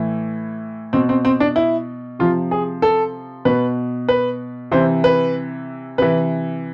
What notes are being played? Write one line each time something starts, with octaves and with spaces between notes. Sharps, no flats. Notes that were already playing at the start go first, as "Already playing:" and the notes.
Already playing: A2 E3
B2 C4
C4
C4
D4
E4
C3 F3 F4
G#4
A4
B2 B4
B4
C3 E3 C5
B4
C3 E3 B4